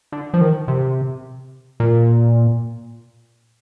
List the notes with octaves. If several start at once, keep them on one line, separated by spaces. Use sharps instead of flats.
D3
F3
D#3
C3
A#2